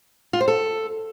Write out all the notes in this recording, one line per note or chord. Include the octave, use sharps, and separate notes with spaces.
F4
C5
A4